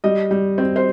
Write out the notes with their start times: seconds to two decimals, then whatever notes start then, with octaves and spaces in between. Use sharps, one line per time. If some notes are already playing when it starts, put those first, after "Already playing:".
0.04 G3 D#5
0.31 G3
0.58 C4
0.76 C5